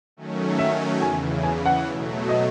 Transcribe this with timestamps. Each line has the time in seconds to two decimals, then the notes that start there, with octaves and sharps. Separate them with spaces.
0.17 D#3 F#3 A3 C#4
0.59 E5
1.01 E2 C#3 E3 G#5
1.43 G#5
1.66 F#5
1.87 B2 F#3 A3
2.29 D#5